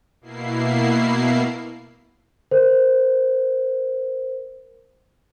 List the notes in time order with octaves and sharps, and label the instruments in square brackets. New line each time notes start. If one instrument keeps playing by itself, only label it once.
[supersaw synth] B2 A#3 E4 C7
[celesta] A#4 C5